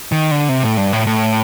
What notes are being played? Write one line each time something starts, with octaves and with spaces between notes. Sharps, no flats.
D#3
D3
C3
A2
G2
A2
A2